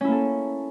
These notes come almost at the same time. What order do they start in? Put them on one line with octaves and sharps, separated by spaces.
C#4 E4 A#3 A4